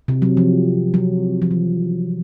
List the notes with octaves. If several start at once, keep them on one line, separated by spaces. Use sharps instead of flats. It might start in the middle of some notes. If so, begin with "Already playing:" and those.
C3
F#3
F3
F#3
F3
E3